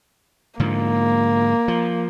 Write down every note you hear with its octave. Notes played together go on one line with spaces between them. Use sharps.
G#2 D3 F3 A#3
F3